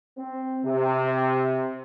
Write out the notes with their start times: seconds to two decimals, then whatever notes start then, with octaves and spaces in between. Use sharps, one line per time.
0.18 C4
0.65 C3